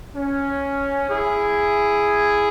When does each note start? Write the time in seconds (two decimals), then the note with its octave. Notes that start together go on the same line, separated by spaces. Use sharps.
0.14 C#4
1.09 E4 G#4